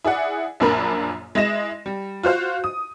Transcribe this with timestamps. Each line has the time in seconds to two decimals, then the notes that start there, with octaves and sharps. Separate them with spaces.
0.04 E4 G#4 D5 F#5
0.60 A#1 F#2 A#3 D4 A#4 B5
1.35 G#3 E4 D#5 A#6 E7
1.86 G3
2.23 F4 F#4 C5 F5
2.64 D#6